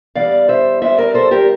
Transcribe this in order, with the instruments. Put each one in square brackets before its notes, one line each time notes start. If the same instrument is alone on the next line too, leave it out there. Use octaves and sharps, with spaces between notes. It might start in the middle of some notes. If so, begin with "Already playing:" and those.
[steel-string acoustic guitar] E2 E3 G3 D5 F5
C5 E5
E2 E3 G3 C5 E5
A#4 D5
A4 C5
G4 A#4